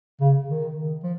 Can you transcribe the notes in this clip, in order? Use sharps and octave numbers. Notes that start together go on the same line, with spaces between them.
C#3
D#3
F3